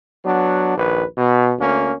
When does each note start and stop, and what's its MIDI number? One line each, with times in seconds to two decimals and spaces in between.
0.25 0.74 54
0.25 0.74 59
0.25 0.74 62
0.77 1.04 34
0.77 1.04 39
0.77 1.04 71
1.18 1.53 47
1.59 1.93 38
1.59 1.93 58
1.59 1.93 61